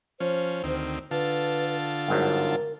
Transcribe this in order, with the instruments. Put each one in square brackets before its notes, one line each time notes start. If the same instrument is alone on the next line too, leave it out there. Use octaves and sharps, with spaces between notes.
[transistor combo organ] F3 C#4 [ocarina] C5
[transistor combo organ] D2 D#3 C4
[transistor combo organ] D3 F4 A5 [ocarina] B4
[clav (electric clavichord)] G1 G#2 F#3 [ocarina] A#4